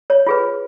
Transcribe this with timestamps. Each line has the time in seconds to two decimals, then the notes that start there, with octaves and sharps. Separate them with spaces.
0.10 C#5
0.27 F4 G#4 B4